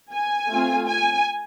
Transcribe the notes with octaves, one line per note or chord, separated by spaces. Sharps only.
G#5
A3 C4 F4
G#5